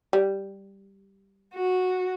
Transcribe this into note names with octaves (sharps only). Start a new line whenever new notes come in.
G3
F#4